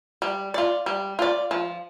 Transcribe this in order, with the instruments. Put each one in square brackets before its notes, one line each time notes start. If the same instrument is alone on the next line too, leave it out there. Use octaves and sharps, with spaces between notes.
[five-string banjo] G3
F4 D5
G3
F4 D5
F3